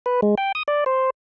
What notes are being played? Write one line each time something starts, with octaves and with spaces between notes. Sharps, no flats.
B4
G#3
G5
D#6
D5
C5